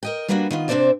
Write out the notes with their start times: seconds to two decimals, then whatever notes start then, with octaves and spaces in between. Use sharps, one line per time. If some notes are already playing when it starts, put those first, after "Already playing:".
0.03 A#4 D#5 G5
0.28 G3 A#3 B3 D4 F4 F#4
0.51 D#3 B3 F4
0.68 C3 C4 D4 C5 D5 E5